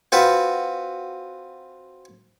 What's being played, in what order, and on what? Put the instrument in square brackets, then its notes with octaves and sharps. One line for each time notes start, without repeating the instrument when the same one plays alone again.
[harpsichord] C4 F4 F#4 B4